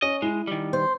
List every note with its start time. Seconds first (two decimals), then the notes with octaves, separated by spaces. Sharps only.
0.02 C#4 D#5
0.22 G#3 E4
0.47 D#3 G3
0.73 C5